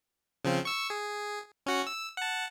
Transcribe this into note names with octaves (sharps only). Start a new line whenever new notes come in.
C#3 F3 C4
C#6 E6
G#4
C#4 F#4 F#5
E6
F#5 A5